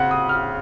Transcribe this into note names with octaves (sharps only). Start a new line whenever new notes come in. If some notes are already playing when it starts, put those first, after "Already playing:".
Already playing: C#3 C4 F#5
D#6
F6